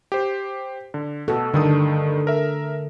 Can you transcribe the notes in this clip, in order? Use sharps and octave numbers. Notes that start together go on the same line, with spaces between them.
G4 C5
D3
B2 F#4 A4
G2 D3 D#3 D#6
A#4 E5